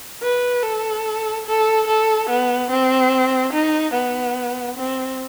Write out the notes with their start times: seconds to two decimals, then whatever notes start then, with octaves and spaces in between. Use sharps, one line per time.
0.22 B4
0.63 A4
1.46 A4
1.87 A4
2.30 B3
2.71 C4
3.53 D#4
3.94 B3
4.78 C4